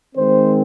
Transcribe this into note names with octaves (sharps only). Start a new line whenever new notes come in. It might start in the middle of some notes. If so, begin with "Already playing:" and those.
D#3 G#3 C4 C5